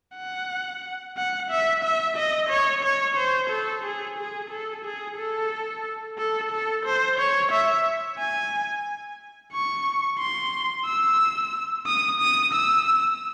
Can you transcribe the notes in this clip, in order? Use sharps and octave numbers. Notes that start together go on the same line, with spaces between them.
F#5
F#5
E5
E5
D#5
C#5
C#5
C5
A4
G#4
G#4
A4
G#4
A4
A4
A4
C5
C#5
E5
G#5
C#6
C6
E6
D#6
D#6
E6